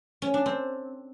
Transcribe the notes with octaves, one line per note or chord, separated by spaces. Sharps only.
C#4
D4
C4